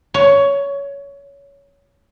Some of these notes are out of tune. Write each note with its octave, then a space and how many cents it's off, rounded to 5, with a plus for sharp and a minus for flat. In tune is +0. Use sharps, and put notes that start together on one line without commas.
C#5 +15